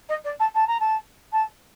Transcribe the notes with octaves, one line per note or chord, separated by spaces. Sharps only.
D#5
D5
A5
A5
A#5
A5
A5